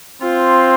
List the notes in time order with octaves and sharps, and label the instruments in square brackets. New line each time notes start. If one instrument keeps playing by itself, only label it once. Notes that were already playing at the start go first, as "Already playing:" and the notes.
[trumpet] C4 [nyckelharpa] F4